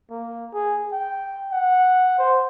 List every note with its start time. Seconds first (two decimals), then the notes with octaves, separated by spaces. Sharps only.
0.10 A#3
0.53 G#4
0.92 G5
1.52 F#5
2.19 C5